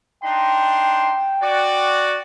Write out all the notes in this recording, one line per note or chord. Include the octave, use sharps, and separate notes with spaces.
D4 D#4 G5 C6
F#4 D5